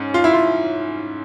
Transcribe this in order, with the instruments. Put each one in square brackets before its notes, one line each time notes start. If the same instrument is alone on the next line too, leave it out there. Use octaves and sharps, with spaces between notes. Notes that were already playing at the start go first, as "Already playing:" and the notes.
Already playing: [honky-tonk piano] G#2 C#4
[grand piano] F4
E4
F4